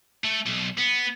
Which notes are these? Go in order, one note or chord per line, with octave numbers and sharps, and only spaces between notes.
A3
B1
B3